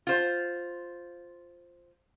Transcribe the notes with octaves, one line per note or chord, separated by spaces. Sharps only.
F4 C5